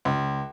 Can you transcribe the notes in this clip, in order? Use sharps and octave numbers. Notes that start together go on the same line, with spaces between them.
C#2